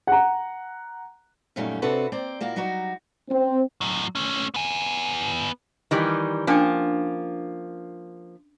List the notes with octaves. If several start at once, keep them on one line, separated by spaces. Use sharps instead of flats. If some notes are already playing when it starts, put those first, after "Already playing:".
F#5 A#5
F#2 A#2 D#3 G3 A3 C#4
C3 C4 D4 F#4 A4 B4
A#3 C4 D5 G5
A#2 A#3 E4 F#4
F#3 G3 D#4 F#4
C4
A2 F#3
A3 C#4
B3 G#5
D#3 E3 G3
F3 A#3 C#4 D4 G5